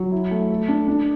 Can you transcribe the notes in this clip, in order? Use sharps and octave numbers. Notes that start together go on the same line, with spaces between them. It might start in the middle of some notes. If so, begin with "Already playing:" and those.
Already playing: F#3
E4
A3
A4
D4
D4